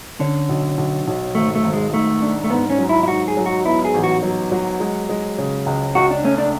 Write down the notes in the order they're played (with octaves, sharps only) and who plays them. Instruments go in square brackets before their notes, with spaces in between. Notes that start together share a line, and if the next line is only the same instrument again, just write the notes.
[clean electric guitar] D3 [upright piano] C#4
[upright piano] B1
B1
B1
[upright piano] G#1 [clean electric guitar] A3
[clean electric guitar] A3
[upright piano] G#1
[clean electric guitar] G#3
[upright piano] G#2 [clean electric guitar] A3
[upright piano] D4
[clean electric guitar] A3
[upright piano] G#2 [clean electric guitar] B3
[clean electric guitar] C#4
[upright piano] F#3
[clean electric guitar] E4
E4
[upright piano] G#2 [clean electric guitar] F#4
[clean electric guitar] G#4
[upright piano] F#3
[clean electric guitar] F#4
[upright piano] B3 [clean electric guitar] E4
[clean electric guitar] G#4
[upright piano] A1
[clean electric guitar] F#4
[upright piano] F#3
F#3
G#3
G#3
C#3
C#2
[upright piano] C#2 [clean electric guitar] F#4
[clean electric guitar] D4
[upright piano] A3 [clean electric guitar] C#4
[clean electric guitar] D4